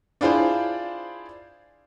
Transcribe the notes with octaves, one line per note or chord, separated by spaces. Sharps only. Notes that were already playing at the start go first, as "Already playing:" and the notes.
D4 E4 F4 G#4 C5 D5